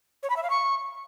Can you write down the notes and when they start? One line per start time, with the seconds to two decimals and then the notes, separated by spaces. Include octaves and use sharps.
0.23 C#5
0.30 B5
0.36 E5
0.43 F5
0.50 C#6